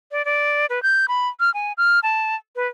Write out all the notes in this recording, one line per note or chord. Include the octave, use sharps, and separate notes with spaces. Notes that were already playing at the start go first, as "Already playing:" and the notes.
D5
D5
B4
G6
B5
F6
G#5
F6
A5
B4